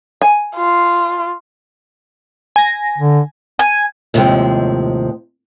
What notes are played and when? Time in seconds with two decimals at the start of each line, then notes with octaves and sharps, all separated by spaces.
0.22 G#5
0.56 F4
2.56 G#5 A#6
2.98 D3
3.59 G#5
4.14 D#2 A2 C3 D#3 F3 G#3